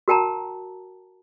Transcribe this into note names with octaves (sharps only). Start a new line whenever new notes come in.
F#4 A#4 G5 A5 A#5